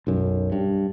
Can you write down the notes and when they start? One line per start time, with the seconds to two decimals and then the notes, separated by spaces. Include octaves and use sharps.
0.07 B1 F#2
0.52 G2